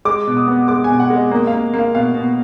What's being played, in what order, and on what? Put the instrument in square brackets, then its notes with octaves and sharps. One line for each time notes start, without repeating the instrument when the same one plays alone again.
[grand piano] G#3 D6
B2
D#6
B3
G#3 D6
G#5
B2
F#5
G#3
D#5
A#3 D#5
A#3 F5
A#3
F5
B2 F5
B2